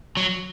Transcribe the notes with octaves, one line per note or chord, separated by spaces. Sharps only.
F#3